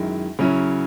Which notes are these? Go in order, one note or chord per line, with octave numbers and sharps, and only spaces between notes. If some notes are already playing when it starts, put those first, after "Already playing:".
Already playing: F#2 D#3 G#3 E4
C#3 F#3 C#4 E4